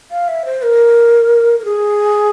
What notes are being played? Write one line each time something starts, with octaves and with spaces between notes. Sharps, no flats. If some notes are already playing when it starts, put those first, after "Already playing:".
F5
E5
C5
A#4
A#4
G#4